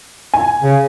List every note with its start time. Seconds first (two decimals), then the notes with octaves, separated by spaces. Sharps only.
0.33 G#5
0.62 C#3